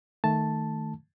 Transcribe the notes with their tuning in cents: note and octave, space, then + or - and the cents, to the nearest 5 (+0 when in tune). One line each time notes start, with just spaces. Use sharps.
D#3 +0 A3 +0 A5 +0